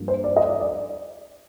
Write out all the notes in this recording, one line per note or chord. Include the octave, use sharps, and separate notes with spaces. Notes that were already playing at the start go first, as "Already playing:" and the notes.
Already playing: G2 F3 A#3
C5
D5
D#5
D5
D5